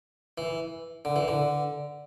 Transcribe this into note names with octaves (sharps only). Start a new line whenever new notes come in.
E3
D3
E3
D3